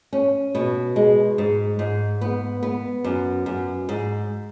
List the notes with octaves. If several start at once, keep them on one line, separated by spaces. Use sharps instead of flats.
C#4
B2
G#3
G#2
G#2
B3
B3
F#2
F#2
G#2